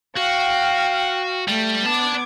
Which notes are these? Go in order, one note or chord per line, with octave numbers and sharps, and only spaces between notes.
F#4 F5 G5
G3 A3
B3 D5 A5 D6 G#6